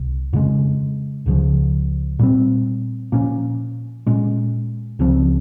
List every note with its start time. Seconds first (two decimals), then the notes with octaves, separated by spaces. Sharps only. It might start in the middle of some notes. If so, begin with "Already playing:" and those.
Already playing: C2 C3
0.33 F2 C#3 G#3
1.26 C#2 C#3 F3
2.19 A#2 G3 C4
3.12 A#2 F3 A#3 C#4
4.07 A#2 G#3 C#4
4.99 C#2 C#3 F3 C4